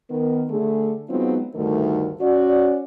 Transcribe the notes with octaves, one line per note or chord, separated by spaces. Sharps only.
D#3 B3 A#4
D3 A3 G#4
F#3 G#3 B3 C4 D#4 F4
D2 G2 D#3 A3 D#4 A#4
C#4 F#4 D5